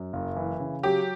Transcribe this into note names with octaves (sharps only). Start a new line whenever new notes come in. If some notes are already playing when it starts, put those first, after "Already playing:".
Already playing: F#2
F#1
E3
C#3
F#3 G4